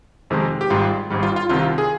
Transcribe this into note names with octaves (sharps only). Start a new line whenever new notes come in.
F2 C3 D#3 G#3
G4
G#1 G#2 G3 F4
G#1 G#2 G3
F4
F4
C2 C3 D#3 F4
G#4